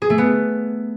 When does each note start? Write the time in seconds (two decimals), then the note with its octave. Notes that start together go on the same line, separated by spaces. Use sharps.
0.02 G#4
0.10 A3
0.18 B3